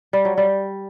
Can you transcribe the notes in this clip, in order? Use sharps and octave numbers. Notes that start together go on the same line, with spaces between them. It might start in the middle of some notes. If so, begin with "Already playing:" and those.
G3
F#3
G3